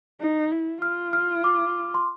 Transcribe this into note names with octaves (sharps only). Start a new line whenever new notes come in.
D#4
E4
F4 F6
F6
D6
C6